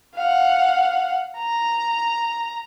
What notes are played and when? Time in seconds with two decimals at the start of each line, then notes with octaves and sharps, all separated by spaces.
0.15 F5 F#5
1.37 A#5